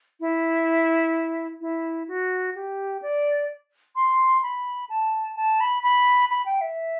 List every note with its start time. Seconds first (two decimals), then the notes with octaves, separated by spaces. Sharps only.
0.20 E4
1.61 E4
2.08 F#4
2.55 G4
3.02 D5
3.96 C6
4.43 B5
4.89 A5
5.36 A5
5.60 B5
5.83 B5
6.30 B5
6.46 G5
6.61 E5